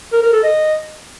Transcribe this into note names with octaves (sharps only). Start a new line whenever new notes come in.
A#4
A#4
A4
D#5